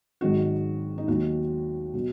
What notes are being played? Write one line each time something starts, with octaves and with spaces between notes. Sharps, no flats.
G#1 G#2 D#3 F#3 F#4
D#4
D#2 D#3 F#3 F#4
B2 F#3